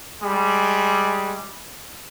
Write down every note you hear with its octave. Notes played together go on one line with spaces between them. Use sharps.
G3 G#3